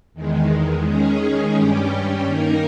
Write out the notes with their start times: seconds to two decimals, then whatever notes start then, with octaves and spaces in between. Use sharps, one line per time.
0.14 E2 D#3 G#3
0.85 D#3 G#3 C#4 G#4
1.55 G2 G3 C#4 G4
2.25 D#3 A#3 D#4 A#4